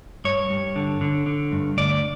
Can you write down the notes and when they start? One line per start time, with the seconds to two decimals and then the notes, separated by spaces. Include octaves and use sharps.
0.25 G2 C#5
0.50 G2
0.76 D3
1.01 D3
1.26 D3
1.52 G2
1.77 D2 D5